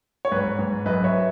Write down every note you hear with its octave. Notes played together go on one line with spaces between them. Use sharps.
C#5
G#2 B4
G#2
F#2 B4 D#5
C#5 E5